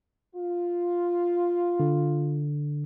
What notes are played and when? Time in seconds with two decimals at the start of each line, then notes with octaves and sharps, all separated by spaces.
0.35 F4
1.80 D3